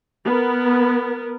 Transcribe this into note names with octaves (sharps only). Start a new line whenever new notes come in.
B3 A#4